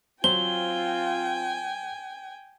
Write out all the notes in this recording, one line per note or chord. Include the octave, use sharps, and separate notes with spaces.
F#3 C4 F4 C5 G5 G#5 G7